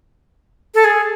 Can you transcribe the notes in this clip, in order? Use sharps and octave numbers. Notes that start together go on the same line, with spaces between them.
A4
G#4